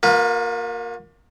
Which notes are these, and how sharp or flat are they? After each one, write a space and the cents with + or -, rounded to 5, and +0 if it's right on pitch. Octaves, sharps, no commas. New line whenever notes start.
A#3 +0 F4 +45 B4 -5